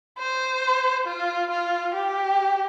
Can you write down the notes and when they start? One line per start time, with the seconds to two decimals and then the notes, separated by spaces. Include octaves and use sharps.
0.18 C5
1.07 F4
1.50 F4
1.94 G4